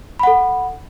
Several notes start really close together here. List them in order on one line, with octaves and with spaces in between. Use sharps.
B5 F#5 A4